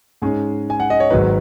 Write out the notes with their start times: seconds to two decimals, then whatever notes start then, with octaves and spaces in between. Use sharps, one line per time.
0.22 G#2 G#3 C#4 G#4
0.70 G#5
0.80 F#5
0.90 D#5
1.00 C#5
1.10 G#1 G#2 D#3 F#3 B4